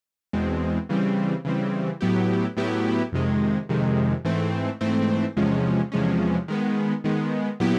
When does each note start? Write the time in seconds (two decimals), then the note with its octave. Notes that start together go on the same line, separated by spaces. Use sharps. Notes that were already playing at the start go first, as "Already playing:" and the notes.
0.33 E2 B2 G#3 C4
0.89 C#3 E3 G3 C4
1.45 C#3 E3 G3 C4
2.01 A2 F#3 B3 E4 G4
2.57 A2 F#3 B3 E4 G4
3.12 F2 C3 D#3 G#3
3.69 F2 C3 D#3 G#3
4.25 G#2 E3 A3 C4
4.81 G#2 E3 A3 C4
5.36 E2 C3 F3 G#3 C#4
5.92 E2 C3 F3 G#3 C#4
6.48 D#3 G#3 B3
7.04 D#3 G#3 B3
7.60 A#2 F#3 B3 E4 G4